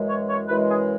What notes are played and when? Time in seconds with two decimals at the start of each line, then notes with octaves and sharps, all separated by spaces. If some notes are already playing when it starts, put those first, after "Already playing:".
Already playing: F#2 E3 G#3
0.08 C#5
0.29 C#5
0.48 F#2 E3 G#3 B4
0.69 G#4